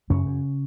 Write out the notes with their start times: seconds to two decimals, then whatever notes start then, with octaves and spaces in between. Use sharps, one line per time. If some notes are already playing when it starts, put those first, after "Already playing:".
0.10 F#2 C#3 C#4
0.26 F#2